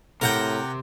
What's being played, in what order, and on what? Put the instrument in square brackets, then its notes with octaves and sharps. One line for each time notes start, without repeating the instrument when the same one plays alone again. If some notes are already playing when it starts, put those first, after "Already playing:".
[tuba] A2 [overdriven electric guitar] C3 [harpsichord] A#4 F#5 G5